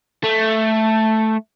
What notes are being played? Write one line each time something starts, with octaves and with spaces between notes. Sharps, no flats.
A3